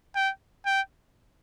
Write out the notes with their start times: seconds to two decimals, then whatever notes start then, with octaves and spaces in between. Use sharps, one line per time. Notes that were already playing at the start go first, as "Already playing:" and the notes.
0.16 G5
0.66 G5